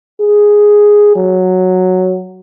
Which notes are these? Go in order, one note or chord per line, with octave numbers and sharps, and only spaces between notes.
G#4
F#3